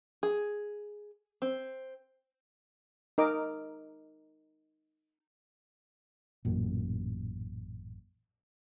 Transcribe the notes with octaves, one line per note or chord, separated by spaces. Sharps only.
G#4
C4
D#4 A#4 D#5 D6
A1 F#2 A#2